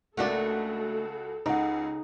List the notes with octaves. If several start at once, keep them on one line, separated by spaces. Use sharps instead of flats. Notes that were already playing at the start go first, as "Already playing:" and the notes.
C#2 A3 A#3 D4 F#4 A4 F#5
C#2 C#3 D#4 F#5